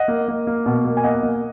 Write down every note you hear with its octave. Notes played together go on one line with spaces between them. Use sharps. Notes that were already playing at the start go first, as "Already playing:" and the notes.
Already playing: D#5 F#5
A#3
A#3
A#3
B2
A#3
G#5
A#3 D#5 F#5
A#3